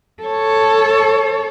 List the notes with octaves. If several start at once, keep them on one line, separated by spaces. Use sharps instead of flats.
A4 C#5